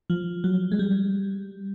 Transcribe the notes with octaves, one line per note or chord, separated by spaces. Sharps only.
F3
F#3
G#3
G3